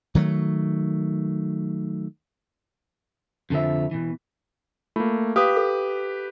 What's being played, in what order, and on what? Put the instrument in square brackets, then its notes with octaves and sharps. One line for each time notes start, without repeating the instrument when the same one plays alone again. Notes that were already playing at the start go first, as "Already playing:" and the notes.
[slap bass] D#3 F#3 G3 A3
[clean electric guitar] F2 D3 F3 E5
B2 E3
[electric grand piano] A3 A#3 [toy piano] F4
[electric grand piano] G4 B4 [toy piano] F5 D#6
[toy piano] A4